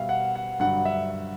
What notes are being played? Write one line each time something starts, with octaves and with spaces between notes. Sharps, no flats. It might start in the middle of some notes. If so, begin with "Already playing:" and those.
Already playing: B2 G3 E5 F5
F#5
F#5
G2 D3 F#3 F#5
E5